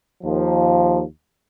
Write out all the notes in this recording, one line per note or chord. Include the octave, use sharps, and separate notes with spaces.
D#2 F3